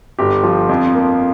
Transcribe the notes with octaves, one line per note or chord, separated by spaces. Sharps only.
G1 G4
F3
F2
A#3